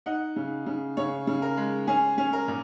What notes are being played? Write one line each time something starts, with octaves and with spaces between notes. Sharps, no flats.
D#4 F#5
C#3
C#3
C#3 C#5
C#3
A#4
G#3
C#4 G#4
C#4
A#4
A#2